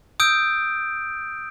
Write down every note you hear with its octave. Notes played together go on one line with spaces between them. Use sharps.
D#6 E6 G6 D7